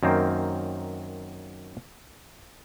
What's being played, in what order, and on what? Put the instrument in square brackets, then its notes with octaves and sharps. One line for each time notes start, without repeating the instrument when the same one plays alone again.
[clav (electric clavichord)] F#2 D#3 A#3 C4